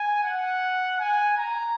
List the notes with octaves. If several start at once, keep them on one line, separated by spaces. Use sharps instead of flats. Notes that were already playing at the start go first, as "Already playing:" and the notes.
Already playing: G#5
F#5
G#5
A#5